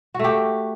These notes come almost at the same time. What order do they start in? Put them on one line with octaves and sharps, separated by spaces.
F#4 A3 G4